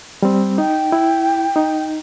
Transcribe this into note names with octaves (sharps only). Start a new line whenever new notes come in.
G3 C4
D#4 G5
E4
D#4